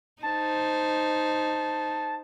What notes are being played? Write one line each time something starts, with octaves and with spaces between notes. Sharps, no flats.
D#4 C5 A5